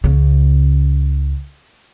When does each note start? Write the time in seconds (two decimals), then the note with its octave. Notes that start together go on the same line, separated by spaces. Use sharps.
0.04 C#2 C#3